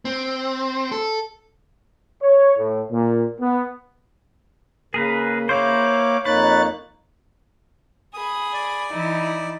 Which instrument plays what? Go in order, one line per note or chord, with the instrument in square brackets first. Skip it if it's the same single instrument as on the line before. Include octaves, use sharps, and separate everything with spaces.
[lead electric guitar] C4
A4
[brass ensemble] C#5
A2
A#2
B3
[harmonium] C#3 [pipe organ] A#3 [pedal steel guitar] G#4 A#4 B4
[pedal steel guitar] A#3 E4 C5 [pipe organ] C#5 F5 D6
[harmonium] F2 A#3 D#4 [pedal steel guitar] B4 [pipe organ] C#5 F#6 A6
[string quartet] G#4 B5 [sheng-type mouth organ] D#6
[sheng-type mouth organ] D5
[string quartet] E3 D#4 E4